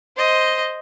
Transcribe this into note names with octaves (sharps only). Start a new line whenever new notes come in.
C5 D#5